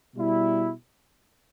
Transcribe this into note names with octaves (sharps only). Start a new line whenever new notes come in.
B2 G3 E4